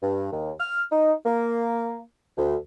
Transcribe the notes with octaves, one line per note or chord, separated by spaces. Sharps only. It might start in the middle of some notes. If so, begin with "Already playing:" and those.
G2
D#2
F6
D#4
A#3
D2